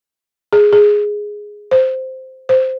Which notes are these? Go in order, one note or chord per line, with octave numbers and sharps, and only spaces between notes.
G#4
G#4
C5
C5